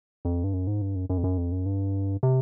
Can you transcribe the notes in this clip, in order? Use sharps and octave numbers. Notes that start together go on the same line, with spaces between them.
F2
G2
F#2
G#2
G2
F#2
F#2
F2
F#2
F2
F#2
G2
C3